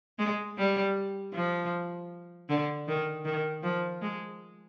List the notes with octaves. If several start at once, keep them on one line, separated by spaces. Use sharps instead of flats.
G#3
G3
F3
D3
D#3
D#3
F3
G#3